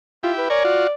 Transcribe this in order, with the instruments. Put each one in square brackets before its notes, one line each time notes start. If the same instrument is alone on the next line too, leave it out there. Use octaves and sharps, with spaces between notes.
[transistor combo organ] E4 G4 [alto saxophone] F4
[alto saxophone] B4
[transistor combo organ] A#4 C#5 G#5 [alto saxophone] D5
[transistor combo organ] F4 F#4